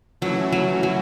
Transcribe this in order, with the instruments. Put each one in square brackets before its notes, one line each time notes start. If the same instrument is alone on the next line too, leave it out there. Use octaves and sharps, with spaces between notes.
[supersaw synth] E3 A3 C#4 E4 [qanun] F#3
[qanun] F#3
F#3